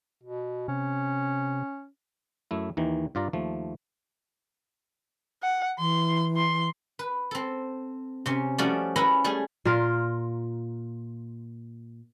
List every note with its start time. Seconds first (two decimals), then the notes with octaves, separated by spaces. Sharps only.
0.23 B2
0.68 C3 C#4
2.51 F#2 A3 E4
2.77 D#2 D#3 E3
3.15 G2 F4 D5 A#5
3.33 D#2 F3 A3
5.43 F#5
5.79 E3 C6
6.37 C6
6.99 B4
7.31 C4 A4
8.26 C3 C#4
8.58 F3 G3 A3 C#4 F#4 D5
8.96 C#4 E4 B4 A#5 B5
9.24 G3 A3 G#4
9.65 A#2 F4 A#4